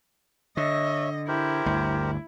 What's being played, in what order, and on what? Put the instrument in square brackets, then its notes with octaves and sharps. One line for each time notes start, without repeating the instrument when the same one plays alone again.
[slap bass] D3 [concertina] C#5 E5 [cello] D#5
[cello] E4 [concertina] G4 A#4 C5
[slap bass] G1 D2